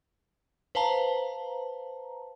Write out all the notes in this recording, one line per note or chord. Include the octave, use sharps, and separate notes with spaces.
B4 C5 F5 A5 A#5